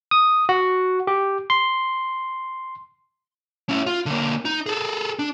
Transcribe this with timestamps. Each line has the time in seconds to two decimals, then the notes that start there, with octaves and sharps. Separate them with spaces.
0.11 D#6
0.49 F#4
1.07 G4
1.50 C6
3.69 C#4 E4
3.86 F4
4.06 D3 A#3
4.45 D#4
4.66 G#4 A4
5.19 D4